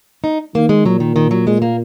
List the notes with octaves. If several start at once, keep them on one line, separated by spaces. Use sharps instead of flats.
D#4
D#3 A#3
G#3
A#2 F#3
D#3
D#3
F#3
G#3
A#3